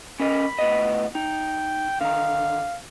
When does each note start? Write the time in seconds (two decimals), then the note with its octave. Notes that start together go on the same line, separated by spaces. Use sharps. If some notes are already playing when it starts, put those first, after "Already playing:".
0.20 C#4 A#4 D#5 B5
0.59 A2 B3 D#5
1.15 D#4 G5
2.01 D3 D#3 F5 A#5